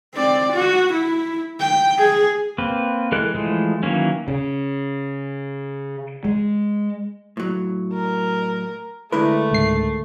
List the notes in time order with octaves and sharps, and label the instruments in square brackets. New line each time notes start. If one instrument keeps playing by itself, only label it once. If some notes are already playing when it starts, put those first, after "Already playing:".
[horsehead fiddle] C4 D5
F#4
E4
G5
G#4
[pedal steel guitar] A#3 C4 B4
E3 G#3 A4 A#4 F#6
E3 F3 G#3 A3
D#3 E3 F#3 A#3 C#4
[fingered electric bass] C#3
G#3
[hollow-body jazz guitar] A2 F#3
[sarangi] A#4
[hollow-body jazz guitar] D3 G#3 A#4 [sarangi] A3 [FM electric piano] E4 B4
[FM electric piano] C#2 G#2 C7